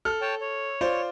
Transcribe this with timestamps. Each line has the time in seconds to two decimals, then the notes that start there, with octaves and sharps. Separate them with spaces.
0.05 A4 F6
0.21 C#5 G5 A5
0.41 C#5
0.81 F4 C5 D5